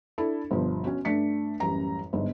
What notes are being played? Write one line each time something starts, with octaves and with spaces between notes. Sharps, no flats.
D4 E4 A4
G1 B2 F3
C#4 F#4
G2 A3 D4 B6 C#7
A1 F#2 G3 A#5
G1 G#2